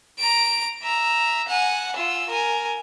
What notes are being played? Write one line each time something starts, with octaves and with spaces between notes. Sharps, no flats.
A#5 D7
E5 A#5
F#5 G#5
F4 E6
A#4 G#5